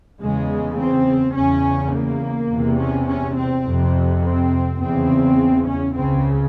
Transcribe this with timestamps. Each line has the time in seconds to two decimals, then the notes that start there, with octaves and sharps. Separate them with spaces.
0.20 E2 C#3 G#3
0.78 C4
1.35 E2 C#3 C#4
1.93 A#3
2.50 E2 C3
2.80 C#4
3.09 C#4
3.37 C4
3.65 F2 C3
4.24 C4
4.81 E2 C#3 C4
5.67 C#4
5.96 C#2 C#3 C4